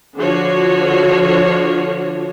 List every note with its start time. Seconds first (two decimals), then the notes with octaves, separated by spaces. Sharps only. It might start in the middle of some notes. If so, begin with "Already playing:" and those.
0.16 D3 F3 F#4 C#5